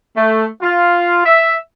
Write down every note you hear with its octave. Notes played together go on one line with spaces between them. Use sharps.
A3
F4
E5